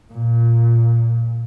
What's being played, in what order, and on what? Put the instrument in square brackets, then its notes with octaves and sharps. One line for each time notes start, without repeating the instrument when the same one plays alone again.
[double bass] A#2